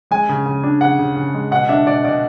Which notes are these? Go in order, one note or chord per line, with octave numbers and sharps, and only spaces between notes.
G#3 G#5
C#3
C#3
D4
C#3 F#5
C#3
C#3
G#3
B2 F#5
D4 E5
B2 D5
B2 D5